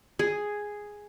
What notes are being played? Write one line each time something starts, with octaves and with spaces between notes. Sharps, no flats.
G#4